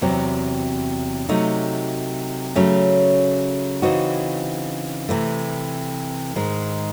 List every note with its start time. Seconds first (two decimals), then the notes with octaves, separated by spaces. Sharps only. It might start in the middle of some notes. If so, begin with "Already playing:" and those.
0.01 E2 C3 F#3 C4
1.29 C3 F#3 A3 D#4
2.55 C#3 F#3 A3 C#4
3.82 C#3 E3 C4 D#4 F#4
5.09 C3 E3 A3
6.36 G#2 D#3 G#3